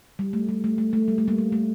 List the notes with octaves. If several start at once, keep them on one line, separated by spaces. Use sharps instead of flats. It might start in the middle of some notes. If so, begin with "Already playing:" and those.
G3
A3
G3
A3
A3
A3
G3
A3
G3 A#3
G3
A3